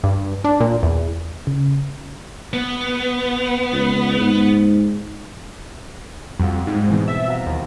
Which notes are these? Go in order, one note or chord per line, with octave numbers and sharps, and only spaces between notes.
G2
D4
A#2
E2
C#3
B3
C#2
G#2
F2 G3 F#4 F5
G#2
B2 E3 C4
E5 A6
F#4 F5 A#5
D#2